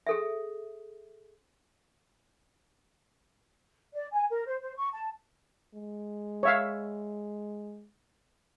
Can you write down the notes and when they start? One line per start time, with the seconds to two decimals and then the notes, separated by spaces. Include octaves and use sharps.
0.07 G#4 A4 E5
3.93 D5
4.12 G#5
4.29 A#4
4.45 C5
4.61 C5
4.76 C#6
4.92 A5
5.75 G#3
6.43 C#5 E5 F5